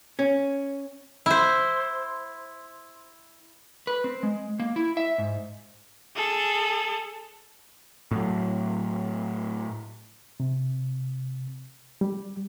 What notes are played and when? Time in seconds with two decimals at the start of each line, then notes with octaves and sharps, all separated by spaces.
0.19 C#4
1.26 E4 C5
3.87 B4
4.04 C4
4.23 G#3
4.60 A#3
4.76 E4
4.97 E5
5.18 G#2
6.16 G#4 A4
8.11 A2 F#3
10.40 C3
12.01 G3